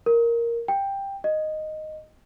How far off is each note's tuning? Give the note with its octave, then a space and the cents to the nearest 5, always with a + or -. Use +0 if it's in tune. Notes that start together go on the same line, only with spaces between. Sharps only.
A#4 +0
G5 +5
D#5 -5